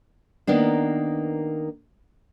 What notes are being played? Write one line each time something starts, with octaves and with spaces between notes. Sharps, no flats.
D#3 A#3 B3 D4